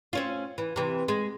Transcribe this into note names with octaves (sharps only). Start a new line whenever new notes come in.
C4 C#4 F4
E3
C3 E3
G#3